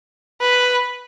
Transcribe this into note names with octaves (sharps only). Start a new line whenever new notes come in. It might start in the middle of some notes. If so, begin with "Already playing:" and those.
B4